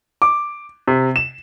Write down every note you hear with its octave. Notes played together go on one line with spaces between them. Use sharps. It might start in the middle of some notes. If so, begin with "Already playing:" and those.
D6
C3
E7